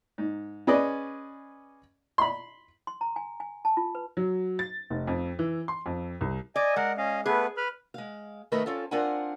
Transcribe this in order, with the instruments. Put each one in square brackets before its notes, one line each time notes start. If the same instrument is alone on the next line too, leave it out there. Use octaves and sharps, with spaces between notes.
[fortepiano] G#2
C#4 G#4 B4 D5 D#5
B5 C6
[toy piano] C6
A#5
G#5
G#5
A5
F4
B4
[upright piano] F#3
A6
F1
F2
E3
C6
F2
C2
[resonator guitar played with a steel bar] D5 [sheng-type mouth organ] D#5 G#5
[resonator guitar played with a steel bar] G#3 [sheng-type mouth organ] A#4 F#5
[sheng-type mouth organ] C#4 D#5 F5
[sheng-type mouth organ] A3 B3 B4 [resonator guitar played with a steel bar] G#4
[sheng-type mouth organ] B4 B5 F6
[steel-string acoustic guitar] G#3 F5
D#3 A3 A#4 B4 D#5 E5
C4 C#4 F4 A4
C4 D4 F4 A#4 F#5 G#5